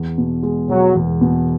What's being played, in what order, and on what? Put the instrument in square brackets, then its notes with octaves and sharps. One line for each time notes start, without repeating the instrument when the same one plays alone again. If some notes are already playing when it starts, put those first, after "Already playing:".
Already playing: [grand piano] E2
B2
G#3
[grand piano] E1 [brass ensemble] F#3
[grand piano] E2
B2